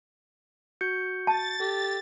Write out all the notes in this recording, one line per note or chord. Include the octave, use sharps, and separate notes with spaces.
F#4 G6 C#7
A5 A6
G4 A4